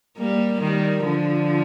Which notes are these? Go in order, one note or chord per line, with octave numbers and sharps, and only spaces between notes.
G3 A#3
D#3 G3
D3 F3